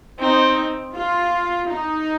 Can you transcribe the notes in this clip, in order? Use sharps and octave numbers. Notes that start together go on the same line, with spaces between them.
C4 D#4
F4
D#4